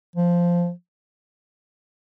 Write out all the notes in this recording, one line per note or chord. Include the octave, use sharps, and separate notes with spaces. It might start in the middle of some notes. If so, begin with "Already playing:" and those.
F3